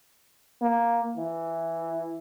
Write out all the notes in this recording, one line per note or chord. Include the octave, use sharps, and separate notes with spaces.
A#3
E3